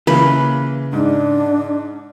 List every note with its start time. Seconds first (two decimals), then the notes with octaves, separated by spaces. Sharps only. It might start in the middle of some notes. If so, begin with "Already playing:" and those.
0.07 C#3 E3 A#3 B4
0.93 G#2 D4